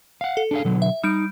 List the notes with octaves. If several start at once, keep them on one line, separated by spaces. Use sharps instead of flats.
F5 F#5
A4
D4 G#4 F5
B2 D3 F#3
E5
G3 D#4 G6 D7